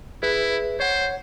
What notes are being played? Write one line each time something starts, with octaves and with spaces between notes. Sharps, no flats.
E4 G#4 B4 E5
C5 C#5 F#5